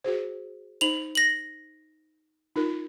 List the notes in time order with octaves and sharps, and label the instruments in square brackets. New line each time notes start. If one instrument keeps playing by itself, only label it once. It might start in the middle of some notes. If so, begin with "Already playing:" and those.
[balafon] F#4 G#4 C5
[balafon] D#4 C5 [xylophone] F7 F#7
[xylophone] A#6 F#7
[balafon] D#4 F4 A#4